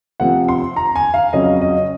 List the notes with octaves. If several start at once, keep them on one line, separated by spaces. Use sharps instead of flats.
C3 F3 C4 F#5
C6
A#5
G#5
F5
F2 C#3 F#3 C#4 D#5
D#5